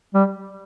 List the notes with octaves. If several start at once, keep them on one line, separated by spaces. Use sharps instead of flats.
G3